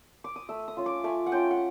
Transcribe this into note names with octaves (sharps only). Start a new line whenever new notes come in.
D6
D#6
A3 E6
D#6
C#4 F4
D6
A3 G#5
F#5
C#4 F4 G5
F#5